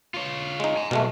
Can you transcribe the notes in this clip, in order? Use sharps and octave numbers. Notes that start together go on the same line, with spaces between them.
F4 C#5
G#3 D#4
G#5 A#5
B1 B2 G#3 A3